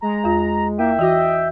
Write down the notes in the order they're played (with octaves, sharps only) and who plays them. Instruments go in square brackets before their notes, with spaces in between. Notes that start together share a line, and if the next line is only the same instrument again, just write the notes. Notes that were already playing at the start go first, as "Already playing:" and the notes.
[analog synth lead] G#3 [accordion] A#5
[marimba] E2 F4
[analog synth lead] A#3 [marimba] E4 [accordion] E5 G5
[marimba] E3 F#4 D6 [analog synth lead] D#5